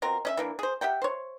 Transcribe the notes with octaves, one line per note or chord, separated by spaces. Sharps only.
B2 C4 F4 A#4
C#4 D#5 E5
E3 A#3 D4
G#4 C5
G4 E5 F#5 G5
C5 C#5